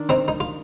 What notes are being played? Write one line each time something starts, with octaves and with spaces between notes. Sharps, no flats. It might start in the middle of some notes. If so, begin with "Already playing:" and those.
Already playing: D#3 D4
C4 D#4
D#4
F4